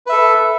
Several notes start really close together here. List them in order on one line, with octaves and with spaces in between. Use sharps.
B4 E5 A4